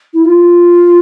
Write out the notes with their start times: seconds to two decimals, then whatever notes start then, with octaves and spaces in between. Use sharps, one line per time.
0.14 E4
0.25 F4